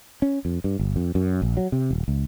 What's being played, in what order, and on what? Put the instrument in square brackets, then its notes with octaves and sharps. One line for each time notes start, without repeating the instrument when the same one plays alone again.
[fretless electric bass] C#4
F2
G2
G1
F2
F#2
A#1
F#3
C3
D#1
C#2